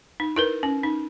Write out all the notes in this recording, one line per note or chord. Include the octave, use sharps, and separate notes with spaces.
D#4
E4 A#4 B4
C#4
D#4